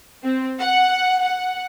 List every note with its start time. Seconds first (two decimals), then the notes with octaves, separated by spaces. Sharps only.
0.24 C4
0.59 F#5
1.22 F#5